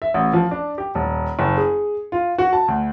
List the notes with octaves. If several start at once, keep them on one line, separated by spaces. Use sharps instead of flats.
E5
A1
F3
D4
G4
D#1
F#1
G#4
F4
F#4
A5
D2